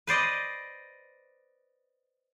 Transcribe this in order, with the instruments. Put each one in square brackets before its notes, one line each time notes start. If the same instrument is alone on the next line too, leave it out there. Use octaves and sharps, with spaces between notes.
[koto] B4 C5 D5 D#5